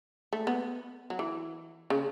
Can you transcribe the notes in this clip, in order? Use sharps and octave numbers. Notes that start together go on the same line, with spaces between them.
A3
B3
F#3
E3
C#3